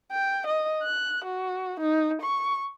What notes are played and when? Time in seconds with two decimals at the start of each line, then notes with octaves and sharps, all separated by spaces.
0.12 G5
0.47 D#5
0.83 F#6
1.24 F#4
1.80 D#4
2.22 C#6